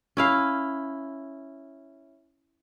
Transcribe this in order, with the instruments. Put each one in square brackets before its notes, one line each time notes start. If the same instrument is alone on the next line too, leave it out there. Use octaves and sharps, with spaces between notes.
[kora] C#4 E4 F5